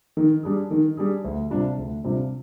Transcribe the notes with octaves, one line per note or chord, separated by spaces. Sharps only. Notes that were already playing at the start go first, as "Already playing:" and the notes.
D#3
G3 D4 G#4
D#3
G3 D4 G#4
D2
C3 G3 D4 F4
D2
C3 G3 D4 F4